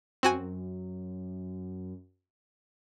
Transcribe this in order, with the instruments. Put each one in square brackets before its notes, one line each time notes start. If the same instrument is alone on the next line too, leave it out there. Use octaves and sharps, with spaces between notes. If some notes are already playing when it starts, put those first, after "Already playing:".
[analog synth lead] F#2 [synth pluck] C4 F#4 G#5